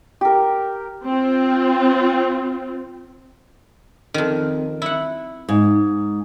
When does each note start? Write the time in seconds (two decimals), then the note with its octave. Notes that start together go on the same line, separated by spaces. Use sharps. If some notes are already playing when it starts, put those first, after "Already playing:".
0.21 G4 A#4
1.04 C4 F4
4.14 F2 D#3
4.82 E4 F#5
5.49 G#2